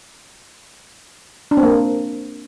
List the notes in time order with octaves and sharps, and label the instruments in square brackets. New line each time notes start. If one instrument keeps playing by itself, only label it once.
[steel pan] D4
C4
A#3